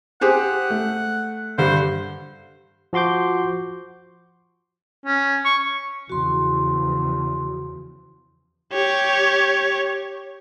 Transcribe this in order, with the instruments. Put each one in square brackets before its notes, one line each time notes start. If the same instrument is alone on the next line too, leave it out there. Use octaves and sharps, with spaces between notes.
[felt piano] G4 G#4 C5 [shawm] F#5
[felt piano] A3
[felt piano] G2 D3 [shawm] C5
[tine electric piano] F3 F#4 C6 D6 G6
[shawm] C#4
C#6
[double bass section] E2 C#3 F3 [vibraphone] F#4 C6
[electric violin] G4 C#5